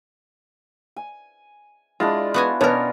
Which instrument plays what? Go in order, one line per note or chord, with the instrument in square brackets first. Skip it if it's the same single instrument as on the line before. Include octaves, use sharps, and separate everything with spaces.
[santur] G#5
[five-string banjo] G#3 [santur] D4 E4 F4
[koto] B3 F#4 G#5
[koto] B2 A#4 [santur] B3 C#4 D4 [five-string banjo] C#5